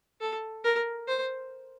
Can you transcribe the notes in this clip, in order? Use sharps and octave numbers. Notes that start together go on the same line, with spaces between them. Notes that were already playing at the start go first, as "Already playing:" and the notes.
A4
A#4
C5